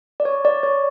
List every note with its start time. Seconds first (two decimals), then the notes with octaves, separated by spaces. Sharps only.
0.20 D5
0.25 C#5
0.45 D5
0.63 C#5